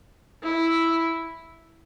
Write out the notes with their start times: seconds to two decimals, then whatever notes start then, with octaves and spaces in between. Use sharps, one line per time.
0.43 E4